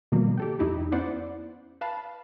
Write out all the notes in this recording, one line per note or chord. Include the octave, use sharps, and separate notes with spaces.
B2 D#3 F3 G3 A#3 B3
G4 A4 G5
F2 D#4 E4 G4
B3 C#4 E4 C5 D5 F#5
B4 F5 A5 B5